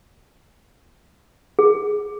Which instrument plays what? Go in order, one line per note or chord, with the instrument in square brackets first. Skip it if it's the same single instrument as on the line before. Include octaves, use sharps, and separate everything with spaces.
[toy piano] G#4